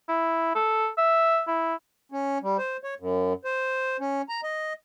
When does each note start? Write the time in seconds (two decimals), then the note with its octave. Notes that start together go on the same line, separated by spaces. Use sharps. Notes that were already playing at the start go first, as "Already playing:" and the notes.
0.09 E4
0.55 A4
0.97 E5
1.47 E4
2.12 C#4
2.42 G3
2.58 C5
2.84 C#5
3.00 F#2
3.45 C5
4.00 C#4
4.29 A#5
4.43 D#5